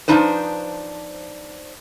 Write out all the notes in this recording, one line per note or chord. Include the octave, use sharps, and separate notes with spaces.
F3 B3 D4 D#4 B4 C5